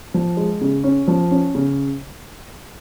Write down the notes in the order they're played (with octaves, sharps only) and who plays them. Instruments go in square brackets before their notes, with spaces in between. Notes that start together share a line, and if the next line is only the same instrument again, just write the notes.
[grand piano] F3
G#3
C#3
C#4
F3
C#4
C#3